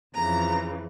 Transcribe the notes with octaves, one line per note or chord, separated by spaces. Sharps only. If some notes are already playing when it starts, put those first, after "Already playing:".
F2 C#3 E3 A#5